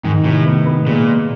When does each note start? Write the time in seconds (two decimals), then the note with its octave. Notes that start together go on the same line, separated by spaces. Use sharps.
0.04 G#2 D#3
0.24 A2 C3
0.46 B3
0.66 B3
0.87 A#2 G#3